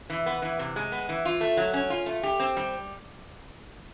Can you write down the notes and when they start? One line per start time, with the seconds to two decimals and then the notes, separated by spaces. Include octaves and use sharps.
0.10 E3
0.26 B3
0.42 E3
0.59 C3
0.76 G#3
0.92 B3
1.09 E3
1.25 F4
1.41 A3
1.57 F#3
1.73 C#4
1.90 F4
2.06 A3
2.23 G4
2.40 C4
2.57 G3